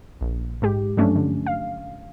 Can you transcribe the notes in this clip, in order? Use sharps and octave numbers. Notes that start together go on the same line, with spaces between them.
A#1
G#2 G#3 G4
G2 F3 F#3 A3 C#4 D4
D3
F5